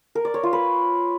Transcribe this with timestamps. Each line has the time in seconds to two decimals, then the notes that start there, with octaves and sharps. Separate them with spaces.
0.15 A#4
0.25 D5
0.34 C#5
0.43 F4
0.53 B4